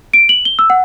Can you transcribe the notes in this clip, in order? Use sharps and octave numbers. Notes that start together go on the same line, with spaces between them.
D7
F#7
G7
E6
F#5